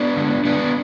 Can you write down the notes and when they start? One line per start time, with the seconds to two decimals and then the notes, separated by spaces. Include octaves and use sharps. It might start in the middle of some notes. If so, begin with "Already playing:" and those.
Already playing: B3 D4
0.16 D3 G#3
0.45 D3 G#3 B3 D4